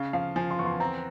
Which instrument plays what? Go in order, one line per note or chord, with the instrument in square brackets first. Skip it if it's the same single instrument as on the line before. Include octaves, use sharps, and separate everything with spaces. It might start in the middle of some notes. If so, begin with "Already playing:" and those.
Already playing: [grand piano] C#3 [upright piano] F5
[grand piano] F3 [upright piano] F5
[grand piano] F3 [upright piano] G#5
[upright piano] C6
[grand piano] E2 [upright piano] C#6
[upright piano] C6
[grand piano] C4 [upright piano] A#5